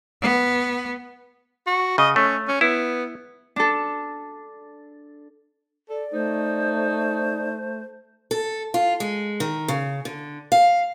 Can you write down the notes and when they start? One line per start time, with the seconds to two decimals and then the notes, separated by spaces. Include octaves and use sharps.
0.22 B3
1.66 F#4
1.98 C#3 D#5
2.16 A3 C#4
2.48 C#4
2.61 B3 E4
3.56 D4 A4
5.90 A4 D5
6.13 A3 D#4 C5
8.31 A4
8.74 F4
9.00 G#3
9.40 D#3
9.68 C#3
10.05 D3
10.52 F5